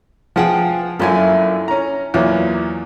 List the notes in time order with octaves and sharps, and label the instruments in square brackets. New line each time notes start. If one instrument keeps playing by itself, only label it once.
[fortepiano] F3 F4 G#4 [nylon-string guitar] B4 F#5 G5
[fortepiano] A#1 F#2 G#5 [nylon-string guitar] E4 F4 A4
[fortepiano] C#4 A#5
[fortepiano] E2 A#2 F#3 [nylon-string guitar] F4